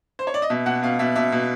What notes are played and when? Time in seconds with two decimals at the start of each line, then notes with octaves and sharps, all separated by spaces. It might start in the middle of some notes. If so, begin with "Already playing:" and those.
0.19 C5
0.27 C#5
0.34 D5
0.42 D#5
0.50 B2 E5
0.66 B2 F#5
0.82 B2 F5
0.99 B2 E5
1.16 B2 E5
1.32 B2